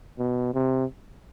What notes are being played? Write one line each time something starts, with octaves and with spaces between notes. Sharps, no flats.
B2
C3